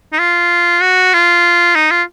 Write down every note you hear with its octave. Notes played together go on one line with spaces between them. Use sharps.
D#4
F4
F#4
F4
D#4
F4